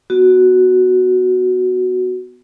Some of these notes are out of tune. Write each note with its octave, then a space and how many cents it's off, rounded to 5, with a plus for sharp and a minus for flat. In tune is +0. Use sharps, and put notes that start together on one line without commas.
B3 +0 F#4 +0